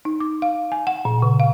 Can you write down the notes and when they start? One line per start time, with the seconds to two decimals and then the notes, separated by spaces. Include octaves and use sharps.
0.05 D#4
0.20 D6
0.42 F5
0.72 G#5
0.87 F#5
1.05 A#2
1.22 C#3
1.40 F5